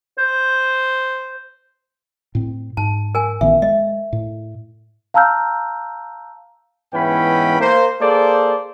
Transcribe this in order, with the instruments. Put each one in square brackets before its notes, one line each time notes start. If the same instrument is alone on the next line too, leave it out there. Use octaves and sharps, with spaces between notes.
[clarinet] C5
[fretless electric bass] A2 C4
[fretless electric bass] G#2 [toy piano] A5
[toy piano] A#4 G#5
[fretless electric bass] A1 D#3 B3 [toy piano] E5
[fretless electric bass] G#3 [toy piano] D#5 E5
[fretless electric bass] A2
[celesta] F5 A5 A#5 E6 F6 G6
[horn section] G#2 E3 B3 C#4 G5 B5
A#3 C5
A#3 G#4 A4 C5 D5